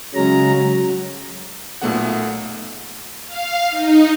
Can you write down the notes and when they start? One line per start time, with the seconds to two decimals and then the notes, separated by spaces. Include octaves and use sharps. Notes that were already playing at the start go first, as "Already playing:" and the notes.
0.15 C#3 F#3 G#3 C#4 A#5
0.58 F#3
1.82 B1 A#2 A3 B3 G#4 F#5
3.26 F5
3.71 D#4